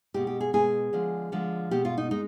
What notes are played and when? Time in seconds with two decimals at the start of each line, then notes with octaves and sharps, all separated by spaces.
0.14 B2 G#3 G4
0.27 G4
0.40 G#4
0.53 B2 G#3 G#4
0.93 D3 F3 G#3
1.32 D3 F3 G#3
1.71 B2 G#3 G4
1.85 F4
1.98 D#4
2.11 G#3 D#4